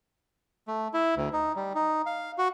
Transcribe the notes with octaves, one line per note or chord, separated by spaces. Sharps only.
A3
E4
D2
D#4
G3
D#4
F5
F#4